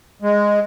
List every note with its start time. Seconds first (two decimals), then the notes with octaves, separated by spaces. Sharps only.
0.22 G#3